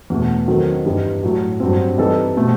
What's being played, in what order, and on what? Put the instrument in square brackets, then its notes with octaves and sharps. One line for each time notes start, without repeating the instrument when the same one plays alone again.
[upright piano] E2 B2 A3
D#3 F#3 C4 D#4 A4
G2 E3 G3 D#4
A2 F#3 A3
G2 F#3 C4
C3 E3 G3 D#4 A4
B2 A3 C4